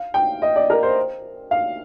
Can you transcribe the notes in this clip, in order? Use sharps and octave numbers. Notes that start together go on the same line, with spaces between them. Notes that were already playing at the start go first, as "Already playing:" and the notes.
Already playing: F5
G5
D#5
D5
A#4
C5
F5